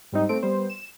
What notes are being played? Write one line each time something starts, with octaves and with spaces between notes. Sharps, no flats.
G#2 G3 C4 D#4
A3 C4 D7
G3 B3 C5
E7